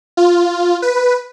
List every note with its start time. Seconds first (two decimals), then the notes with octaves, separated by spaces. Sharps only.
0.17 F4
0.82 B4